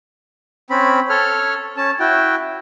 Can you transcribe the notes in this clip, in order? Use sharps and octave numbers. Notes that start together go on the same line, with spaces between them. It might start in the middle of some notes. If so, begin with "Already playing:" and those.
C4 C#4 B5
A4 C#5 F6
C#4 A5
E4 F#4 G5